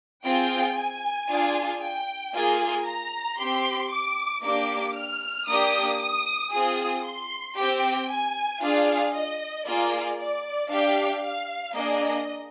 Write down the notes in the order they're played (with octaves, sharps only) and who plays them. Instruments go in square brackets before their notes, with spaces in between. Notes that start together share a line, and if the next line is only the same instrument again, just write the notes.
[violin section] C4 F4 G#4 G5
G#5
D4 F4 G#4
G5
A#3 F4 G#4 G#5
A#5
C4 G4 C6
D6
A#3 D4 G4 D6
F6
A#3 D4 G4 D#6
D#6
C4 F4 G#4 D#6
C6
C4 G4 G5
G#5
D4 F4 G#4 F5
D#5
A#3 F4 G#4 D5
D5
D4 G4 F5
F5
A#3 D4 G#4 D#5